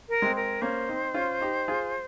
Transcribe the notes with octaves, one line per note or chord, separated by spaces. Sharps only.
A#4
G#3 C4
A#4
A#3 C#4 C5
C4 D#4
C#4 F4
D#4 G4
F4 G#4